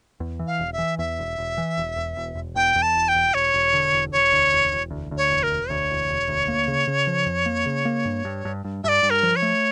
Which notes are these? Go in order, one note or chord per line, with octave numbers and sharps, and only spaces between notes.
E2
E3
F5
E1
E5
E3
E2 E5
E1
E1
E3
E1
E2
E1
E1
E2 G5
E2
A5
E1
G5
E1
E1 C#5
E1
D3
E1
E1 C#5
D2
E1
E1
D2
D2
C#5
E1
A#4
E1
D2 C#5
E1
E1
D2
A#3
C#3
C#3
F3
F2
A#3
C#3
A#3
G2
G2
G2
G2
G2 D5 E5
G2
A#4
F3
C#5
A3